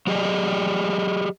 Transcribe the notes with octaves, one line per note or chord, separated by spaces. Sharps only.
F#3 G4 G#4 D5 D#5